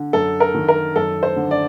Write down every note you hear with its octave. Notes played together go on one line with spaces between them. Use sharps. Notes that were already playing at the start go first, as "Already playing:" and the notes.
Already playing: D3
F#2 A4
A#4
D#3
A#4
F#2 A4
C5
D3
D5